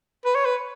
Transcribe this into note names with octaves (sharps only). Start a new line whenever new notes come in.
B4
C#5
B4